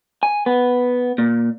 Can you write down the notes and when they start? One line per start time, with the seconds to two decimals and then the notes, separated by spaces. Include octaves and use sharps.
0.23 G#5
0.46 B3
1.18 A#2